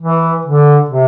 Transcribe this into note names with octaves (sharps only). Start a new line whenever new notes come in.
E3
D3
C3